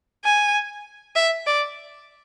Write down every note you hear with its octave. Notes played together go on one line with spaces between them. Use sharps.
G#5
E5
D5